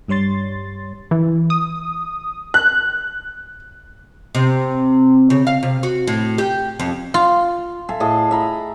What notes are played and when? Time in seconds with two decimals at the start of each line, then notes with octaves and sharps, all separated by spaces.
0.08 G2 G3 C#5 C6 A6
1.11 E3
1.50 D#6
2.54 F#6
4.35 C3
5.30 C#3
5.47 F5
5.63 C3
5.83 F#4
6.07 A2
6.38 G4
6.80 F2
7.14 F4
7.89 A4 E5 F5 G#5
8.00 A2 G#4 D#5 A5
8.31 E5 A#5 B5